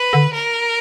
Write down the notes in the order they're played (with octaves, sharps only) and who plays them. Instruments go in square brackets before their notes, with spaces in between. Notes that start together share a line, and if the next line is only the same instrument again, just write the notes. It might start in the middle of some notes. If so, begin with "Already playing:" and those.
Already playing: [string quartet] B4
[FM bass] D3
[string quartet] A#4